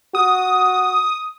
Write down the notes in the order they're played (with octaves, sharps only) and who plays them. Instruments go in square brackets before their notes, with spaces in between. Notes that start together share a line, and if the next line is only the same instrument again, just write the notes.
[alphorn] F#4 [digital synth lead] D#6